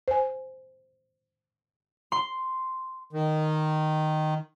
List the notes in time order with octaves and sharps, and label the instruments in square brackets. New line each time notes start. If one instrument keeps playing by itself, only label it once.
[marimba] C5 G#5
[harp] C6
[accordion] D#3